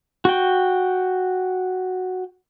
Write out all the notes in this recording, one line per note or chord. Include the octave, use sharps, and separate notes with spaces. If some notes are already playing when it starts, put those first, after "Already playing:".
F#4 G5